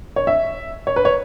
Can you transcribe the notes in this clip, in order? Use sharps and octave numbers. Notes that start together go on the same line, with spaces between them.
C#5
E5
C#5
B4
C#5